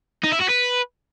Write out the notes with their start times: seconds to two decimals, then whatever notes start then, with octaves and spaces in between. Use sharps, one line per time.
0.23 D#4
0.32 E4
0.41 F#4
0.49 B4